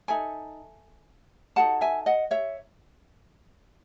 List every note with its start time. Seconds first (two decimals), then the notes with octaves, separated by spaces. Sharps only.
0.08 D#4 A4 E5 G#5
1.56 D#4 F#4 A4 F#5 A5
1.81 E5 G#5
2.06 D#5 F#5
2.31 C#5 E5